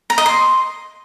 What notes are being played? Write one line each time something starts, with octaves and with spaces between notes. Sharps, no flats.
A#5
D#5
C6